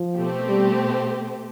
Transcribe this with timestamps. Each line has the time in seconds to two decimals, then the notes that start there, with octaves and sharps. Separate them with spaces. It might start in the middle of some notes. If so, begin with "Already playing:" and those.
Already playing: F3
0.17 B2 A3 C4 G4
0.48 G3